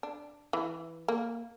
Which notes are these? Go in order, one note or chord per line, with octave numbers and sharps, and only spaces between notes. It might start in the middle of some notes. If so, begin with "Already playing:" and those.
D4
E3
A#3